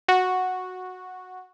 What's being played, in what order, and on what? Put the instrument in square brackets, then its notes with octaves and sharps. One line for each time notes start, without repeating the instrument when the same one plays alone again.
[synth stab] F#4